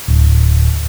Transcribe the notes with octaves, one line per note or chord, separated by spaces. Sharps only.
D1